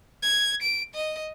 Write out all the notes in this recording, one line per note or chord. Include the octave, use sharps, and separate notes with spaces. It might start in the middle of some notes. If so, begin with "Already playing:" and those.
G#6
D7
D#5